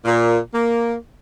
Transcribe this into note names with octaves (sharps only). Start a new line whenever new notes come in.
A#2
A#3